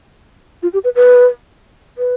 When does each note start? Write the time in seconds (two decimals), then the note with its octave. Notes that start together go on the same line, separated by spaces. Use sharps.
0.63 F4
0.73 G4
0.84 B4
0.96 B4
1.98 B4